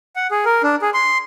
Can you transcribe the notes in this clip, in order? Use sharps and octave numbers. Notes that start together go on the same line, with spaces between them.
F#5
G#4
A#4
D4
G#4
C6